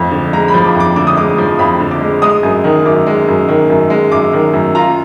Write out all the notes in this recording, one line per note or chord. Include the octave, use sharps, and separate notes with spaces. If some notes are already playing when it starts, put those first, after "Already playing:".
Already playing: F2 F3 D#5
D3
G#3 A#5
B5
F3
D6
F2
D6
D3 D6
D#6
G#3 D6
F3
F2 B5
D3
D6
G#3
G#3 D#6
F#2
D#3
F#2 D6
G#3
F#2
D#3
F#2
G#3
F#2 D6
D#3
F#2
F4 A#5